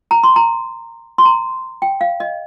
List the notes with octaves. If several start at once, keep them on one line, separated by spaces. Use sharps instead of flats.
A#5
C6
A#5
C6
A#5
G5
F5
D#5